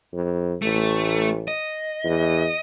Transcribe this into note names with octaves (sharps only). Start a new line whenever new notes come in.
F2
A1 A3
D#5
E2